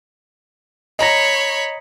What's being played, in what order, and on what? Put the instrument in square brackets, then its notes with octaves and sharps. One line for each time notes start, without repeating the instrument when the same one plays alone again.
[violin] C#5 B5 [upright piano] D#5 A#5 A#6